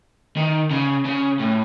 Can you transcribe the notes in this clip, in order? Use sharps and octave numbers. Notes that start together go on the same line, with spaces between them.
D#3
C#3
C#3
A2